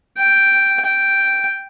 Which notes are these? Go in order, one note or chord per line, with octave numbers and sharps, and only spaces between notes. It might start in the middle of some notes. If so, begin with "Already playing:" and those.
G5
G5